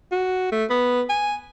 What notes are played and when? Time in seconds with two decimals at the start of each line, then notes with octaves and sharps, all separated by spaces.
0.11 F#4
0.52 A3
0.70 B3
1.09 G#5